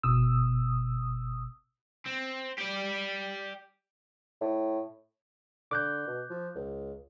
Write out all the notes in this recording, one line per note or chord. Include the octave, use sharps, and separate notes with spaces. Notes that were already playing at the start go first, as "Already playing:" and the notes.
G1 B2 D#6 E6
C4
G4 D5
A2
D3 D6 F#6 G6
B2
F3
C#2